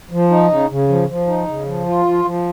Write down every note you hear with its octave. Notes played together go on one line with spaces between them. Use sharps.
F3
D#4
C#3
C#3
F3
F3
D#4
C#3
F3
F4
F3
F3